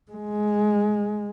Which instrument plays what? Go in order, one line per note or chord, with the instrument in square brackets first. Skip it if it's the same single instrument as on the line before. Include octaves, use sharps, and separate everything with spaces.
[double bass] G#3